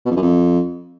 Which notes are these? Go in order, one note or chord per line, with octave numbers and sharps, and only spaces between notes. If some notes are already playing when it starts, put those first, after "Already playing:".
B2
F2
F#2
F2